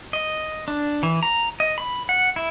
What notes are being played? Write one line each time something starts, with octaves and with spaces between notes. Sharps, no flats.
D#5
D4
E3
A#5
D#5
B5
F#5
E4